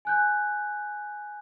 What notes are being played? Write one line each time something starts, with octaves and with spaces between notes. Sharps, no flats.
G#5 F#6 G6